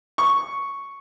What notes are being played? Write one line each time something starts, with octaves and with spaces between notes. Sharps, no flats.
C#6